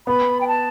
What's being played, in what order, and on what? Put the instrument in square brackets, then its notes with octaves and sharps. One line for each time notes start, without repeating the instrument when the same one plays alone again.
[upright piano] B3 [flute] B5
[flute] G5
A5